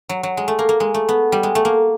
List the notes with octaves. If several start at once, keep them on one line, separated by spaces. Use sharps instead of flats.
F#3
F#3
G#3
A3
A#3
A#3
G#3
A3
B3
G3
G#3
A3
A#3